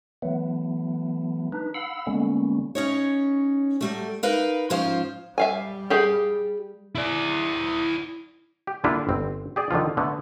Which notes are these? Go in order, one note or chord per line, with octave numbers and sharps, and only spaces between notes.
E3 F#3 A3 B3
D4 D#4 B4
F5 F#5 B5 E6
D3 G3 G#3 A#3 B3 C#4
C#4 D#4 C#5
F#3 G3 A3
D#4 A#4 B4 F5
G#2 F3 C#4 F4 C5 F5
G3 E5 F5 G#5
G4 G#4 F5
E4 D5
G4
D3 G3 A#3 D4 E4 F4
G1 C4
G4 G#4 D5
D3 D#3 F3 F4
D3 A3 B3